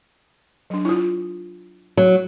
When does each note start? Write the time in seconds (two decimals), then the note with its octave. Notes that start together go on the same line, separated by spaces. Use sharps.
0.70 F#3 D4
0.85 E4 F4
1.97 F#3